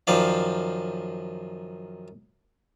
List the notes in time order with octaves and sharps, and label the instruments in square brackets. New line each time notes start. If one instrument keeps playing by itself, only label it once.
[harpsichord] F#2 D#3 F3 D5 F5